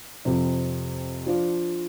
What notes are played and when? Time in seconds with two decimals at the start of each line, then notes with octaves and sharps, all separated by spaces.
0.25 F2 C3 F3
1.26 F3 D4 F4